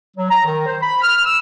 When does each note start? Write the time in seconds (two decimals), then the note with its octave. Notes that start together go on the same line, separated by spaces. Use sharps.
0.16 F#3
0.30 A#5
0.45 D#3
0.66 C5
0.82 B5
1.02 F6
1.25 E6